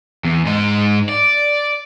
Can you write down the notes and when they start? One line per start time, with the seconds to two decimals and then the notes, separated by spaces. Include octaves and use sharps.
0.24 E2
0.45 G#2 D#4
1.09 D5